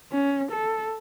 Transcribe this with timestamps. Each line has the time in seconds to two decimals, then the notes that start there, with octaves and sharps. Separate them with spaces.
0.12 C#4
0.52 A4